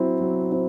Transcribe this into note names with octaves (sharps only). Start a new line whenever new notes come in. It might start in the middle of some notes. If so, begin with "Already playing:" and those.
Already playing: F#3 C4 E4
F#3
C4 E4